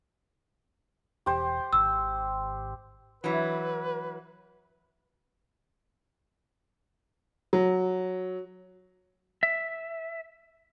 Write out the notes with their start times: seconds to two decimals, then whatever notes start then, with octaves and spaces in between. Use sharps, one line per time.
1.26 E1 G4 C5
1.73 G#1 E6
3.24 E3 F#3 B4
7.53 F#3
9.43 E5